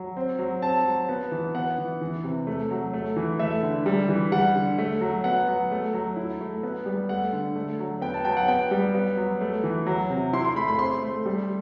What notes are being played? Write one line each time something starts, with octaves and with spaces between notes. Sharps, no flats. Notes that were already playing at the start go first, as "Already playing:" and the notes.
Already playing: F#3
C4
F#3
C4 A5
F#3
B3
E3
B3 F#5
E3
E3
C3
A3
F#3
A3
E3
A3 E5
D3
G3
E3
G3 F#5
D3
A3
F#3
B3 F#5
F#3
A3
F#3
E4
A3
B3
G3
A3 F#5
D3
A3
F#3
B3 G5
A5
F#3 G5
F#5
B3 G5
G3
B3
F#3
A3
E3
F#3
C3
E4 C6
C6
A3 B5
B5
C4 C6
A3
G3